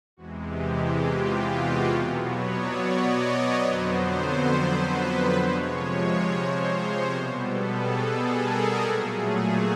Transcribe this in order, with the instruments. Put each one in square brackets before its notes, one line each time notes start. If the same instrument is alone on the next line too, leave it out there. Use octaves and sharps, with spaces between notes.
[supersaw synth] E2 C3 E3 G#3 F#4
G4
G4
F4
F#4
G4
B2 F#3 B3 A4
C#5
D5
D#5
C#5
F2 D3 F#3 B3 C5
B4
C3 F3 G#3 C#5
C5
B2 G3 B3 A#4
A4
G#4
A4
A#4
G#4
A#2 F#3 A3 G4
G#4
G#4